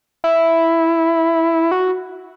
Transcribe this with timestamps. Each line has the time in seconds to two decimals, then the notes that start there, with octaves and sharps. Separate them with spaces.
0.24 E4
1.71 F#4